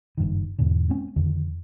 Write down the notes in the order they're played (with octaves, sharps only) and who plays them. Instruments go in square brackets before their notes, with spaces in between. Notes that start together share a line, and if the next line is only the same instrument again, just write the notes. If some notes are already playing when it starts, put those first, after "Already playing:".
[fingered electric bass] F#1 G2 D#3
E2 G#2 B2 D3
G#3 C4 C#4
F2 D3 D#3